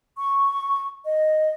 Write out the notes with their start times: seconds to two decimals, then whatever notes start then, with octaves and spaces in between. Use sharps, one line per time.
0.18 C#6
1.05 D#5